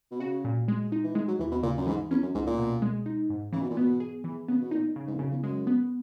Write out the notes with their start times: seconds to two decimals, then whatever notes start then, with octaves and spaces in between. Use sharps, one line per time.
0.11 B2
0.20 C#3 F#4
0.44 A#2
0.68 G#3
0.92 D#4
1.04 E3
1.15 D#3 G#3
1.28 F#3
1.39 D#2 E3
1.52 B2
1.63 A#2 C#3
1.78 F#2
1.86 G#2 E3
2.10 E2 C#4
2.23 F#2
2.34 C#2 G#2
2.46 A#2
2.58 B2
2.82 G#3
3.06 D#4
3.30 G#2
3.53 C#3 E3
3.62 B2
3.70 A#2
3.77 B2 B3
4.00 G#4
4.24 E3
4.48 C#3 B3
4.61 B2
4.71 A#2 D#4
4.96 C#3
5.07 G#2
5.15 E2
5.19 F#2 C#3
5.31 E2
5.43 F#2 G#3
5.67 B3